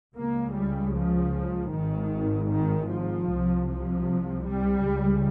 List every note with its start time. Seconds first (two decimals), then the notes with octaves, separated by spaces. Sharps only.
0.15 C#2 C#3 A#3
0.54 G3
0.93 F3
1.71 G#1 G#2 D#3
2.49 D#3
2.88 F3
3.28 C2 C3
3.66 F3
4.45 G3
4.84 C#2 C#3